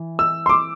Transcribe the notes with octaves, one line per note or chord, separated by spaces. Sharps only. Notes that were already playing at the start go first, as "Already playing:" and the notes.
Already playing: E3
E6
C6
D6